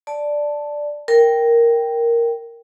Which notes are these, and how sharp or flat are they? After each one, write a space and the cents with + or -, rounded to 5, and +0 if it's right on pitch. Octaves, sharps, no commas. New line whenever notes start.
D5 +0 A5 +0
A#4 +0 G5 +0